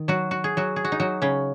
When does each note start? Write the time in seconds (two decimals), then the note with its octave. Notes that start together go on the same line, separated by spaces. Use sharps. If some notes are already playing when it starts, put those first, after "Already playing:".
Already playing: D#3
0.08 F#3 F#4
0.31 F#4
0.44 G#4
0.57 F#3 F#4
0.76 G#4
0.85 F#4
0.92 D#4
1.00 F#3 F#4
1.22 C#3 C#4